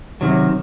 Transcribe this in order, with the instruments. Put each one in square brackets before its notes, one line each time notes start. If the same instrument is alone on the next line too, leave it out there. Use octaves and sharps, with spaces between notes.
[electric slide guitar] C3 D#3 F#3